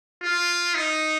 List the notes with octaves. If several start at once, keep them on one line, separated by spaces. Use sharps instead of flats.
F4
D#4